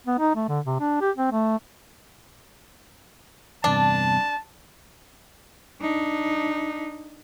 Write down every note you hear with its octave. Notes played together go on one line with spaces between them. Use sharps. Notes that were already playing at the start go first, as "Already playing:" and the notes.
B3
D#4
A3
D3
C3
D4
G4
C4
A3
E2 G2 C3 D4 A5
D4 D#4